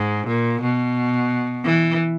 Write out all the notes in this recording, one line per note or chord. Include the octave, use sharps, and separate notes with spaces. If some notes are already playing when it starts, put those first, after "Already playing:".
Already playing: G#2
A#2
B2
E3